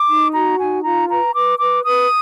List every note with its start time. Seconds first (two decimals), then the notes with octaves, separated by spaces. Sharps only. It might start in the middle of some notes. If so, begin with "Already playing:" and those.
Already playing: D6
0.08 D#4
0.33 F#4 A#5
0.58 D#4 G#5
0.83 F4 A#5
1.09 B4 A#5
1.33 B4 D6
1.59 B4 D6
1.84 B4 D#6